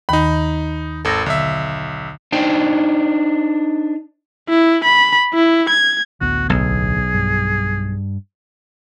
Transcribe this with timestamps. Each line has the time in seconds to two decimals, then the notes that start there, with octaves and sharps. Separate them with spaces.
0.09 D#2 D#3 D#4 B5
1.05 G#1 A4 E6 A#6
1.26 B1 D3 E5
2.32 D4 D#4 C5 G5
4.49 E4
4.84 B5
5.34 E4
5.69 G#6
6.21 A1 D2 B3 F#4
6.50 B1 G#4
7.14 G2